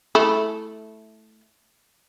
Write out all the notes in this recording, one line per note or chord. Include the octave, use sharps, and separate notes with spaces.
A3 E4